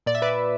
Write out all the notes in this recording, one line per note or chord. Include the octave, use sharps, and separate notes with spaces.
A#2 D5
E5
B4 D5